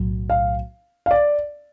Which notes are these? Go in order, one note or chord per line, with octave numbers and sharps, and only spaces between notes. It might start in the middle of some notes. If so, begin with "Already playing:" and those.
Already playing: B1 A2 F#3
F5
F5
D5